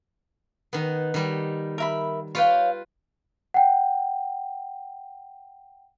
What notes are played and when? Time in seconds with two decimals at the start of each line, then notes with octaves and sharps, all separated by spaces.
0.73 D#3 B3
1.14 D#3 G3
1.78 A#4 E5 B5
2.35 F4 B4 C#5 F5 G5
3.54 F#5 G5